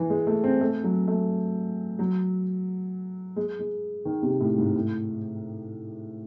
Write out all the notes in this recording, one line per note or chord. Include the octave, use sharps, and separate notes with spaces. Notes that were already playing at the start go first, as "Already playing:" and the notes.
Already playing: E3
G#3
A3
C4
A3
F#3
A3
F#3
G#3
G#3
D#3
C3
A2
G#2
A2